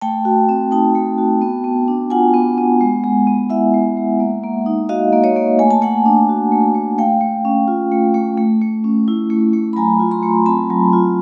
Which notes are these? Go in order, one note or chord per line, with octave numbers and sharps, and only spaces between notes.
A3 G5 A5
F#4
C4
D#4 G5 A5
A3
F#4
B3
B3
D4
F4 F#5 G#5
B3
B3
G#3
G#3
B3
E4 E5 F#5
G#3
G#3
A#3
A#3
D#4
F#4 D#5 F5
A#3
C#5 D#5
A#3
A3 G#5
A5
A3 F#5 G#5
D4
F#4
A3
A3
A3 F5 G5
A3
C#4
F4
A3
A3
A3
A3
C#4
E4
A3
A3
B5
F#3 G#5 A#5
F4
A#5 C6
A3
C4 A5 B5
F#3
F4